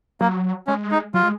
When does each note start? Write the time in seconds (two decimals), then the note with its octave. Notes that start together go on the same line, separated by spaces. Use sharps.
0.21 F#3 A#3
0.67 G#3 C#4
0.91 D#4
1.14 F#3 F4
1.23 G#3